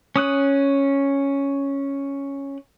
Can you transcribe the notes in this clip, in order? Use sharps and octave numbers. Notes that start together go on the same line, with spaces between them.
C#4 D#6 F#6